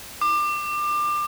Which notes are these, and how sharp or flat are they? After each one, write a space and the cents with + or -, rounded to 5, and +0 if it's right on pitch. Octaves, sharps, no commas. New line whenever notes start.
D6 +25